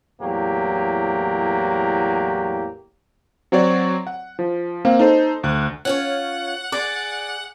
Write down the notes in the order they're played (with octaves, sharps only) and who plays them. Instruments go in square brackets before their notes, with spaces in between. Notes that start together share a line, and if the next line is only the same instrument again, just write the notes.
[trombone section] E2 A2 F#3 A#3 G4
[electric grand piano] F#3 C4 F#4 C#5 D5
F#5
F3
A#3 C4 F5
D#4 A4 C5
D2 F#6
[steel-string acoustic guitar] C#4 F4 C#5 [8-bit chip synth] F#5
[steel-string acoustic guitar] G#4 [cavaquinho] D5